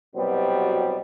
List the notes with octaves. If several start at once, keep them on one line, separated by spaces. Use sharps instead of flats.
C2 B2 F#3 G3 B3 C4